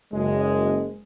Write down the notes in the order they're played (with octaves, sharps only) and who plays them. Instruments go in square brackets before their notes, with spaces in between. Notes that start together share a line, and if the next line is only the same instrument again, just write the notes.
[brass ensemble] F#1 G#3